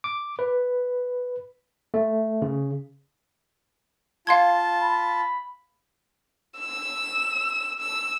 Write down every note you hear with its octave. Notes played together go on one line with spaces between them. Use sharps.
D6
B4
A3
C#3
F4 F5 A5 C6 G#6
B5
E6
E6